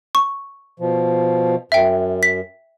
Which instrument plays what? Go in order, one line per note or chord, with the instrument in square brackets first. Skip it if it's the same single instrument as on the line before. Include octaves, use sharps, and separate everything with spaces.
[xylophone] C#6
[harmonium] B2 F3
[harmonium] F#2 [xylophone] E5 G5
[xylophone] B6